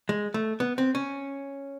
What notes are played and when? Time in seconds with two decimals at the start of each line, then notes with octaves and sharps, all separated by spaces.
0.09 G#3
0.34 A3
0.60 B3
0.78 C4
0.95 C#4